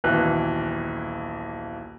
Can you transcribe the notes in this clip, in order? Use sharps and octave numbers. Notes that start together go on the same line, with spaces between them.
D#1 B1 E3 F#6